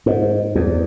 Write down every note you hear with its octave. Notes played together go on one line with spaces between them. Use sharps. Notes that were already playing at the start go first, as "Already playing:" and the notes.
G#2
E2